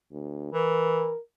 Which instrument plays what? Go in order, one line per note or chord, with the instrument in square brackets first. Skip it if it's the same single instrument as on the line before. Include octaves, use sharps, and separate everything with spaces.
[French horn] D2
[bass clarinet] E3 [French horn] A#4